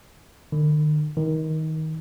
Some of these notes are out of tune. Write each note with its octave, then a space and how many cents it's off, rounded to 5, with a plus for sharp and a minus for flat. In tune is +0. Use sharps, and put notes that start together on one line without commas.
D#3 -45
D#3 +20